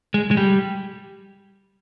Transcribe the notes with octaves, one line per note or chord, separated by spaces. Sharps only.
G#3
G#3
G3